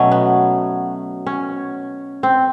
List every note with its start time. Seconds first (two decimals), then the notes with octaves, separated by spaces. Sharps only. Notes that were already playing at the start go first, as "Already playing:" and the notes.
Already playing: B2 F#3 A3 C#4
0.11 B3
1.27 C#4
2.23 C4